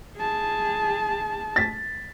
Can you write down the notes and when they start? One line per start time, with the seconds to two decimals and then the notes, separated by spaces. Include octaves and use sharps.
0.17 G#4 A5
1.56 A6 B6